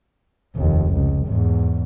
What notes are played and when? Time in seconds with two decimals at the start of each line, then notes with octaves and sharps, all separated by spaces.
0.56 F1 D#2
0.94 C#2
1.27 E2 G#2